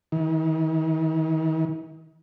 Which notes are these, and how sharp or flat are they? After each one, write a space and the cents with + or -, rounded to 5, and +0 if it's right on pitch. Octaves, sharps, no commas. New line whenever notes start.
D#3 +45